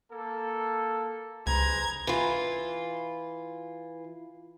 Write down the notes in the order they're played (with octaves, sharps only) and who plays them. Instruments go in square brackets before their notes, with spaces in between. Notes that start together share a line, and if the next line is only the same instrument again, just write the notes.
[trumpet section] A#3 A4
[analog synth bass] C#2 [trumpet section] G#4 B4 C5 [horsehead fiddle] A#5 [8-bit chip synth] G#6
[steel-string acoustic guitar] E3 F4